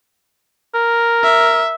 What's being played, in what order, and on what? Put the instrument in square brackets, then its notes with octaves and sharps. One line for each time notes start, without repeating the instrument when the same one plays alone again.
[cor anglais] A#4
[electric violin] E5